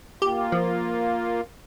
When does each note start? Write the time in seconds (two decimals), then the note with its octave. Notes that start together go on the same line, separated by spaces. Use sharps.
0.22 A#3 F4 G4
0.52 F3